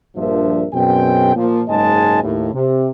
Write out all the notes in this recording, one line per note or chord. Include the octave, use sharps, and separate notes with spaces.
A#1 G2 F3 D4 A#4 E5
F#2 B2 C4 G#4 G5
A#2 F3
F#1 G#2 G#3 D#5 G#5 A5
D#2 A2
C3